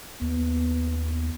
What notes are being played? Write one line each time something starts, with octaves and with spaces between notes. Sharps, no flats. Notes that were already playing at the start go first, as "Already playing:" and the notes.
D#2 B3